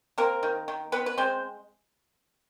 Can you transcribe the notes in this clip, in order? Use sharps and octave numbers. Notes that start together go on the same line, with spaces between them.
A#3 C4 A#4
D#3
D#3
B3 C4 B4
B4
G#3 C4 C5